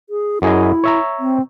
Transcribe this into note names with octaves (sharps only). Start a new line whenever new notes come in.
G#4
F#2 E4 G#4 D#5
C#5 E5 A#5
C4